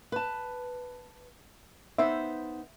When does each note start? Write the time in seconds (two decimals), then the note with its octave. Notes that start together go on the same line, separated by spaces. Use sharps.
0.12 B4 A5
1.98 B3 D#4 C5 E5